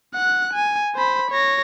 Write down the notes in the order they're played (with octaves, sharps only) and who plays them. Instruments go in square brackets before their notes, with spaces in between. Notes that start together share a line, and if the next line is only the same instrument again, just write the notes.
[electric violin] F#5 F#6
G#5
C5 B5
C#5 A#6